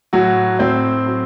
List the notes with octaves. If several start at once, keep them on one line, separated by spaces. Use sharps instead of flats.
A2 F#3 F#4
A2 C4 C5
F#3